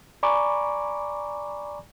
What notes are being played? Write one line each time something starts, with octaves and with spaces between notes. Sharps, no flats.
D5 G#5 A#5 B5 C#6 D6